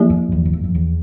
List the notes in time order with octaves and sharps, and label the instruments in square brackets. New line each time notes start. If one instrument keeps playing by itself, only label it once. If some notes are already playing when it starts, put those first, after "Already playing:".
Already playing: [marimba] F3 A#3 E4 G4 D5
[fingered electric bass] F2
E2
E2
F2
F2
E2